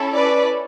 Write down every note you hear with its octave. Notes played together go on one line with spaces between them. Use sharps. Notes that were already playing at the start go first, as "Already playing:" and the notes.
Already playing: C#4 E4 A4
B4 D5